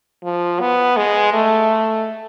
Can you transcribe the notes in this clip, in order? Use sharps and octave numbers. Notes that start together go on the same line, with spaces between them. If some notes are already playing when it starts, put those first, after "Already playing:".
F3
B3
G#3
A3